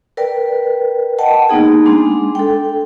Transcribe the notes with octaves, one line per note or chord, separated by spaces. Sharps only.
A#4 B4 D5 G5
D#5 F#5 G5 A5
A#3 B3 D#4 G#4
G#3 D4 C6
A4 G5